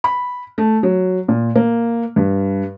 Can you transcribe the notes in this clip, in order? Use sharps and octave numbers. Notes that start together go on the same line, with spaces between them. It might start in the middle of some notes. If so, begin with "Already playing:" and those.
B5
A3
F#3
A#2
A#3
G2